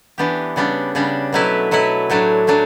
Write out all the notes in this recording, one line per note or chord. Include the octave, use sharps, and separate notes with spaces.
E3 B3 D4 G4
C#3 G3 B3 D4
C#3 G3 B3 D4
B2 F#3 A3 E4 B4
B2 F#3 A3 E4 B4
A2 F#3 A3 D4
A2 F#3 A3 D4